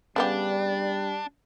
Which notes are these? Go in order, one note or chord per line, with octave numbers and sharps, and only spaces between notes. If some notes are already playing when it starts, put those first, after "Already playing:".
C#3 G3 B3 D4 G4